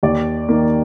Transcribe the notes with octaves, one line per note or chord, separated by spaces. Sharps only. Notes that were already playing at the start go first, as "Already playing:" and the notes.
D#2 D5
D#3 A#3